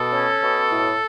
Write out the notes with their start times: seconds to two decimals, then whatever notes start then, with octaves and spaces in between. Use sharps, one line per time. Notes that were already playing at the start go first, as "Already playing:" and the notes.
Already playing: B2 A4
0.12 C#4
0.42 B2
0.71 A2